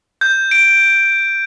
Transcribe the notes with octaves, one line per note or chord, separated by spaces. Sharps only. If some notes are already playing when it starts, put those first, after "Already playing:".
G6
D7